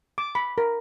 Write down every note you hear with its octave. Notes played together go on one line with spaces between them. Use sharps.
D6
B5
A#4